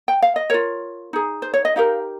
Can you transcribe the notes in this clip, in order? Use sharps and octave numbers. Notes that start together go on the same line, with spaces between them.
G5
F5
D#5
F4 A#4 C#5
D#4 G#4
C5
C#5
D#5
D#4 G4 A#4 F5